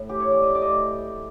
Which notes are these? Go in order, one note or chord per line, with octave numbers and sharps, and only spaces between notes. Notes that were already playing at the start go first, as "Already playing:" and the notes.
Already playing: A2
E3 G4
C#5
E3 D5
D#5
A2 D5
D#5